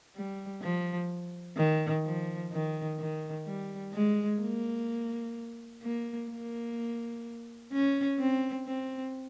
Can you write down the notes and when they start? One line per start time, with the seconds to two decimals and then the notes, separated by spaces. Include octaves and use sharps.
0.16 G3
0.62 F3
1.57 D#3
2.05 F3
2.52 D#3
2.99 D#3
3.46 G3
3.94 G#3
4.41 A#3
5.82 A#3
6.30 A#3
7.73 C#4
8.19 C4
8.67 C4